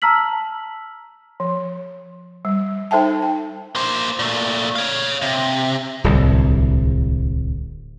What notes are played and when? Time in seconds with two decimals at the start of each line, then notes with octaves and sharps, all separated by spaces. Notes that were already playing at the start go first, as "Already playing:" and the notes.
0.02 A5 A#5 E6 F6 B6 F#7
1.40 F3
2.45 G3
2.91 D#4 A4 C5 E5 G5 A5
3.22 G5
3.75 A#3 C5
4.19 A#2 A3
4.76 C#5 F5
5.22 C3
6.04 D1 C2